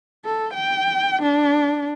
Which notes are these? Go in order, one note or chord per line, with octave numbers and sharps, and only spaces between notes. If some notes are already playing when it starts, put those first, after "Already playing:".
A4
G5
D4